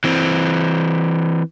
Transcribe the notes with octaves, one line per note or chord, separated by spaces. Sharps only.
E3 C4